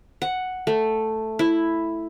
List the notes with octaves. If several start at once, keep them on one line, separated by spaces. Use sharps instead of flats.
F#5
A3
E4